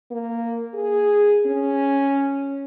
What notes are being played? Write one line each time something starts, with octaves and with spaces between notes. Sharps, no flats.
A#3
G#4
C#4